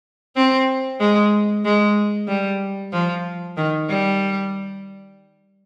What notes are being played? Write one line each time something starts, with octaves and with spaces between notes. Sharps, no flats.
C4
G#3
G#3
G3
F3
D#3
G3